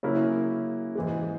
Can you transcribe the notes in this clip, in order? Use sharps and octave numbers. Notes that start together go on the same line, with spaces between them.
C#3 F#3 A#3 C#4 E4
G#2 E3 G#3